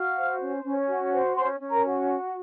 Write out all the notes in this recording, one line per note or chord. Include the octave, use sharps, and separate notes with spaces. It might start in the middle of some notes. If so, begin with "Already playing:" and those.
Already playing: F#4 F5 F6
C5
C#4
C#4
F#4
C5
C#4 C5 C6
C#4
A#4 A#5
F#4